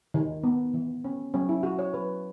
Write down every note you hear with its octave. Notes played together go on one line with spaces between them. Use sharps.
D#3
B3
E3
C#4
F#3 C#4
E4
C#4 F#4
C#5
F#3 B4